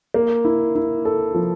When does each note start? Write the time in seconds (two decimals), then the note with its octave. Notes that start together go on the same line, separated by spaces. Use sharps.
0.14 A#3
0.45 E4
0.75 E4
1.05 A4
1.34 F3